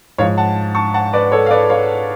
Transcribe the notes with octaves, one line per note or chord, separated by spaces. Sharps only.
G#2 F3 C#5 F5
F#5 A5
A5 C#6
F#5 A5
B4 D5
A4 C#5
F5
B4 D5
C#5 F5